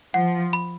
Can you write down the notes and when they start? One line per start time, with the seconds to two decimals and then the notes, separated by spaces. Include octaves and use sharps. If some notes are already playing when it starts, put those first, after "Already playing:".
0.14 F3 F#5
0.53 B5